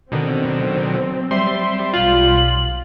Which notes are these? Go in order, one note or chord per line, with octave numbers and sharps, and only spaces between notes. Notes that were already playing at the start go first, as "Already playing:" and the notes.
B2 D3 D#3 F#3 C4
G3 E5 C6
B1 F4 F#7